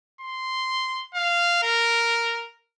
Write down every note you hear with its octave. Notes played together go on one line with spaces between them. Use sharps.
C6
F5
A#4